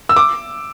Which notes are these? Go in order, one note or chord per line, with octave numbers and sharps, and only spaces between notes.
E6
D6